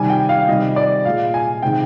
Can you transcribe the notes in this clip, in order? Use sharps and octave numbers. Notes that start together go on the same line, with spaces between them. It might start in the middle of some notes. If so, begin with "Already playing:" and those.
Already playing: C3 D#3 G3 G#5
G5
F5
C3 D#3 G3 D#5
D5
A#2 G#3 F5
G#5
C3 D#3 G#3 G5